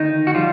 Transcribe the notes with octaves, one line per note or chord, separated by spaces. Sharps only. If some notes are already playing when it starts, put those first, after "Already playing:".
Already playing: D2 D#3 D#4
F#4
F3 G3 F4